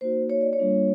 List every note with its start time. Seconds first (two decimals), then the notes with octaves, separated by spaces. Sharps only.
0.01 A#3 D#4 F#4 C5
0.30 C#5
0.41 D5
0.53 C#5
0.58 G3 A#3 D4 F4